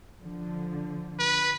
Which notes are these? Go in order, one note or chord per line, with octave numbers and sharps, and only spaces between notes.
D3 F3
B4